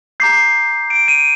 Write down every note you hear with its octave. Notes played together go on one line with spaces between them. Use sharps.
A#5 D6 G6 C7
D7
D#7